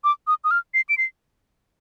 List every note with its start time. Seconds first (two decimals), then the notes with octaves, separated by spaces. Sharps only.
0.04 D6
0.27 D#6
0.44 D#6
0.51 F6
0.74 C7
0.89 D7
0.98 C7